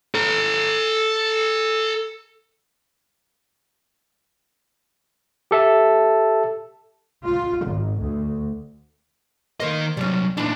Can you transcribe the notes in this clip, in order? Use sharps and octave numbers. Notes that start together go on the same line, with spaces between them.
A4 A#5
G4 A4 E5 A5
F4
G#1
D2
D#3 A#3 C5 D#5
C2 F#3 G3 C#4
A#2 E3 D4 D#4